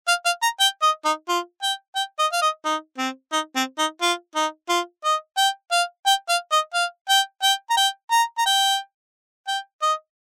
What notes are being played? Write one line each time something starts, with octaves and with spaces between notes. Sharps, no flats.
F5
F5
A#5
G5
D#5
D#4
F4
G5
G5
D#5
F5
D#5
D#4
C4
D#4
C4
D#4
F4
D#4
F4
D#5
G5
F5
G5
F5
D#5
F5
G5
G5
A#5
G5
A#5
A#5
G5
G5
D#5